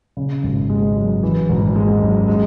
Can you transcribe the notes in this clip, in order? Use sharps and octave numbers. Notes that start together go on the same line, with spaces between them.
C#3
G#1
G#3
F#2
E3
G#1
G#3
F#2
G#3